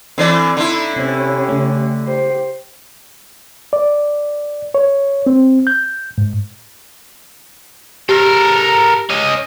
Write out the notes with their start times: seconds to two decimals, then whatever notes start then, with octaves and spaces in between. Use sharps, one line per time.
0.18 D3 E3 C4 D5 C6 C7
0.57 D3 D#4 E4
0.96 C3 C4 C#4 G4
1.49 C#3 A3
2.06 G4 C5
3.73 D5
4.75 C#5
5.27 C4
5.67 G6
6.18 G#2
8.09 G4 A4 A#4
9.09 C#4 D#5